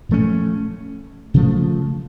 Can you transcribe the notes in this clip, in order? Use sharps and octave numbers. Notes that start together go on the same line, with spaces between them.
A#2 F3 A3 C#4
C#3 F3 A3